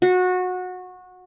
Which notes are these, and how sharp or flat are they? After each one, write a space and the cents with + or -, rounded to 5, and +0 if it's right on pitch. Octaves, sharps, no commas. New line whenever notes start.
F#4 -20